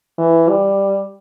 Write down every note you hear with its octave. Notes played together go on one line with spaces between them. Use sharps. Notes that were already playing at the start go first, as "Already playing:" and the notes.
E3
G3